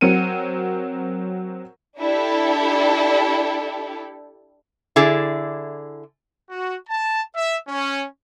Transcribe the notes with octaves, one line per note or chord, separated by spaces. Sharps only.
F#3 C4 A#4 C#7 D#7
D4 E4 G4 A4
D3 E4 G#4 D5
F#4
A5
E5
C#4